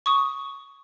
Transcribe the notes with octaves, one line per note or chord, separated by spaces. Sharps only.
C#6 D#6